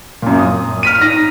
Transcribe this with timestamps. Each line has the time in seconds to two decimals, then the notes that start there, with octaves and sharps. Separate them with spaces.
0.22 F#2 A#2
0.38 D#6
0.83 F6 B6 D#7
1.01 D#4 A#6